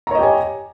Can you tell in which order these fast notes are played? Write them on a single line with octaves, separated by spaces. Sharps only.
A#5 C#5 D#5 G4 G#5